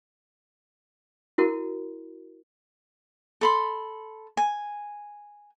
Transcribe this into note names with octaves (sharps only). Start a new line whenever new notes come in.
E4 F#4 A#4
A4 B5 C6
G#5